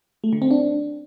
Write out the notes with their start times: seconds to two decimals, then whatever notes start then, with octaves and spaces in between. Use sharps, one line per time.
0.24 A3
0.33 D3
0.42 C4
0.51 D4